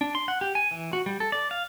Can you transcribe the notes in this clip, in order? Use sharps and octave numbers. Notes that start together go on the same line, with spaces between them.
D4
C6
F#5
G4
G#5
E3
F#4
G3
A4
D5
F5